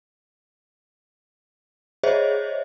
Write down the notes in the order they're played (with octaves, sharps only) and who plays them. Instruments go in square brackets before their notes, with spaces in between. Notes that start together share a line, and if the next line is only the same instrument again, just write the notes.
[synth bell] G#4 C5 C#5 D#5 E5